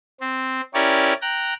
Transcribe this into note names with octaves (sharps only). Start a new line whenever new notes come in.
C4
C#4 E4 G4 A#4 C#5 D5
G5 A#5 F#6